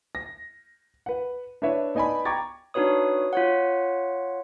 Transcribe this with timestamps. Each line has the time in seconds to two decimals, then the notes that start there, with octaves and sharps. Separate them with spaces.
0.15 A#6
1.06 B4 F#5
1.62 D4 E4 B4 C#5 E5
1.95 B3 D#4 D5 G#5 A5 B5
2.25 G5 A#5 C#6 D6 G#6 A6
2.74 D4 D#4 F#4 B4 C#5 D#6
3.33 F4 C#5 F#5